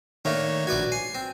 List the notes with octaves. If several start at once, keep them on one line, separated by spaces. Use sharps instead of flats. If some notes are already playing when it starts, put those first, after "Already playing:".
D#3 A3 A#3 D4 C#5
A#1 F#4 B4 D5 G#6
G#5 C7
C4